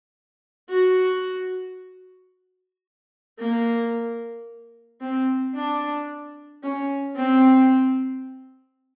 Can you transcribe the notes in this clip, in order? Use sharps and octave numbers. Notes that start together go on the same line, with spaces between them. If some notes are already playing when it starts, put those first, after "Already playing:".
F#4
A#3
C4
D4
C#4
C4